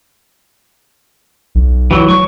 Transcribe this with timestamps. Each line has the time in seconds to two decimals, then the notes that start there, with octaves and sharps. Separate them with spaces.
1.55 B1
1.91 E3 F#3
2.08 F#3 C#6